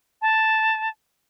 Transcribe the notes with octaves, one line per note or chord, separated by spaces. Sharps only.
A5